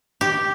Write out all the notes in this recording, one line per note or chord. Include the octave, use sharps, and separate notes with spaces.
G4